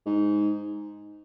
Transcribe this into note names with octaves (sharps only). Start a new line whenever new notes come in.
G#2